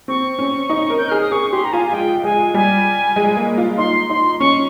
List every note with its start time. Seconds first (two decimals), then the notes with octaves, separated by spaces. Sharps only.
0.08 C4 C#6
0.39 C#4
0.70 D#4
0.90 A#4
0.98 G6
1.09 G#4 F6
1.21 D#6
1.32 G#4 C#6
1.52 G4 C6
1.64 A#5
1.73 F4 G#5
1.86 G#5
1.93 G#3 G5
2.24 G#3 G#5
2.54 G3 G#5
3.16 G#3
3.37 A#3
3.57 F4
3.78 D#4 C6
4.10 D#4 C6
4.39 C#4 C#6